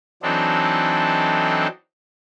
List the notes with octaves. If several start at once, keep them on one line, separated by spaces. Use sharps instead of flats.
E3 F#3 C4 D4 D#4 A4